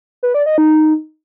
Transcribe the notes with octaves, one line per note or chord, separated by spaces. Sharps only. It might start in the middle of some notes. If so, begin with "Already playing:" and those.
B4
D5
D#5
D#4